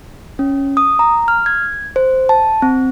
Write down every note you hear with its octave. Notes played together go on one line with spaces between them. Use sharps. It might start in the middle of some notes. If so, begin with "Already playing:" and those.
C#4
D#6
A#5
F6
G#6
C5
A5
C4